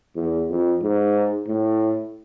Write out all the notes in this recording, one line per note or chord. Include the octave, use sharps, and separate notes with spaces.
E2
F2
G#2
A2